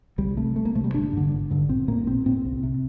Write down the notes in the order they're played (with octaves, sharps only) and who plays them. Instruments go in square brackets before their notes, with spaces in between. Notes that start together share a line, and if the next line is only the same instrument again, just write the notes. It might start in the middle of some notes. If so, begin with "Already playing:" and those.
[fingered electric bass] C2 G3
C3 A3
C2 A3
A#3
C3 A3
G3
G1 D4
G2 D3
G1
G2 D3
A#1 C4
A2 A#3
A#1 C4
A2 C4
C2
C3